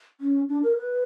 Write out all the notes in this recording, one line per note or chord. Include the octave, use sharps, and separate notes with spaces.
C#4
D4
A#4
B4